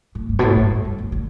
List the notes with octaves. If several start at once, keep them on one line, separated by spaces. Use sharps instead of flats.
A2
G2
B2
A2
G2
E2
G2
D3
D3